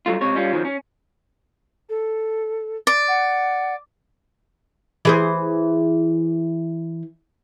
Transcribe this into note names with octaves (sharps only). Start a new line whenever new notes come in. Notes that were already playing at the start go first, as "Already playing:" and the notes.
G2 F#3 A3 F4
C#2 C3 C#5
G3 C#4 F4
F#2 D#3 F3 F#3
C#4
A4
D5
F#5
E3 G#4 C5